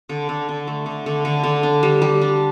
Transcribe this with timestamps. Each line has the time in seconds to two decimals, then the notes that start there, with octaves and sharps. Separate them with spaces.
0.09 D3
0.29 D3
0.49 D3
0.67 A3
0.86 D3
1.06 D3
1.25 D3
1.43 D3
1.63 D4
1.83 G3
2.02 G3
2.21 D4